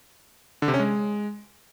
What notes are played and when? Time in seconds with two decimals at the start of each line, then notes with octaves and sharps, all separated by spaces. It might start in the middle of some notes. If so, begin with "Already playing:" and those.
0.62 D3
0.68 C3
0.74 C#4
0.80 G#3